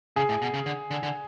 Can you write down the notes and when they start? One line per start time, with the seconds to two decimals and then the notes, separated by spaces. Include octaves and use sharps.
0.16 C#3 G#4
0.29 A2
0.42 B2
0.54 C#3
0.66 D3
0.91 D3
1.03 D3